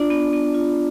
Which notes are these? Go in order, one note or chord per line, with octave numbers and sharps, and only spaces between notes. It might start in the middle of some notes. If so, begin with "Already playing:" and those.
Already playing: D4 F4 D5
B3
B3
F4